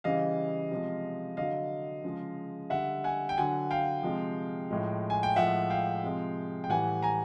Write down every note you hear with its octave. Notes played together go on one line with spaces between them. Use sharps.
C#3 E3 G3 D#5 F5
C3 F3 G#3
D3 F#3 D#5 F5
C#3 F3 G#3
D3 G3 E5 F#5
F#5 G#5
G5
D3 F#3 F#5 G#5
F5 G5
C3 F3 G#3
A2 F3 G#3
G#5
G5
A2 F3 G#3 E5 F#5
F5 G5
C3 F3 G#3
G5
A2 E3 G3 F#5 G#5
G#5 A#5